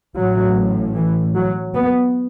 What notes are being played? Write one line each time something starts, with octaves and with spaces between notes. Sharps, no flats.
A1 A2 F#3
E3
F#3
B3